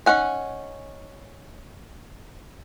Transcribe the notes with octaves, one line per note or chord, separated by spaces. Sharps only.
C#4 D#4 F#5 G#5